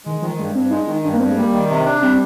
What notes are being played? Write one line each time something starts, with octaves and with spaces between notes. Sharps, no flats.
D#3 G#3
D#3 F3
G2 G#3
G2 C4
G#3 D#4
D#3 D#4
G2 D4
A#3
G2 C4
G#3
G3 A#3
D#3
C3
D4
G3 C4